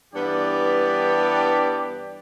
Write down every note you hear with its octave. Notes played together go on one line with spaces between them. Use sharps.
G2 E3 B3 G4 D5